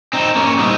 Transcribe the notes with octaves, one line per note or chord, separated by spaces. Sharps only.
C4 D#4
A#3 C#4
A#2 G3 C4 D#4